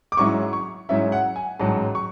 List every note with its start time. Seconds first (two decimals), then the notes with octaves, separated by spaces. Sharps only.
0.12 D6
0.17 G#2 F#3 C#4 E4 C#6
0.53 C#6
0.89 G#2 F#3 C#4 E4 E5
1.12 F#5
1.36 G#5
1.59 A1 G#2 F#3 A5
1.95 C#6